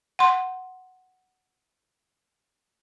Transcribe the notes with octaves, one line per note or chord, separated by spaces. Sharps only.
F#5 C6